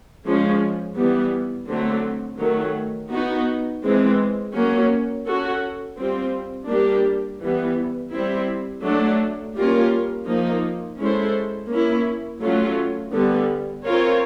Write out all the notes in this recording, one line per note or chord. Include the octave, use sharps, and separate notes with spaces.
F3 G#3 C#4
E3 G3 B3
D3 F#3 A3 C4
D#3 F#3 A3
B3 D#4 F#4
E3 G#3 C4
F#3 A#3 C#4
C#4 F#4 A4
G3 C4 F4
G3 A#3 D4 G4
E3 G3 B3
G3 C4 E4
F#3 A3 D4
G3 A#3 C#4 F4 A#4
F3 A#3 D#4
G#3 C#4 E4 A4 C5
A#3 C#4 E4
F#3 A3 C#4 F4
D3 G3 B3
C4 F4 A#4 C#5